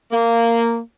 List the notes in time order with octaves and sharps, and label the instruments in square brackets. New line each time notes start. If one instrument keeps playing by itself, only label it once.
[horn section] A#3